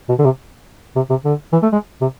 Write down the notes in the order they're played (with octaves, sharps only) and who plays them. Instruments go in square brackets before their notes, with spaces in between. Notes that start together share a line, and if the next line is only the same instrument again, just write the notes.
[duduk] B2
D3
C3
C3
C3
D3
E3
A3
G#3
C3